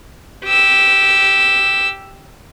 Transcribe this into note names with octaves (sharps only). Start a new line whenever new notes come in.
G4 E6